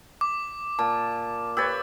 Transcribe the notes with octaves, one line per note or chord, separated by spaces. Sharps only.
D6
A#2 A5
G4 B4 C#5 E6 A6